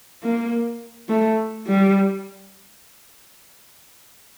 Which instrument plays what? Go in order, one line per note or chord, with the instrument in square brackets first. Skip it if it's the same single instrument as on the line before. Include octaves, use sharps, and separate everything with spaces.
[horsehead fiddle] A#3
A3
G3